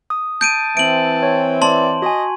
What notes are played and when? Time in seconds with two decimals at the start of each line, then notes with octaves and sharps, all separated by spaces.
0.10 D#6
0.41 A5 G6 D7 D#7
0.77 E3 C4 D7 F#7
1.23 C#5
1.62 D5 A5 C6 F#7
2.02 F#4 D#5 G#5